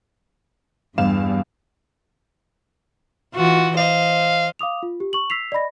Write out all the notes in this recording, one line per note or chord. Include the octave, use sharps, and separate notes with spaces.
E2 G2 F5 E7
E3 F4 F#4
C5 D#5 F5
F5 D6 D#6 F7
F4
G4
C#6 F#7
E6 B6 C7 F7
D5 D#5 B5 A#6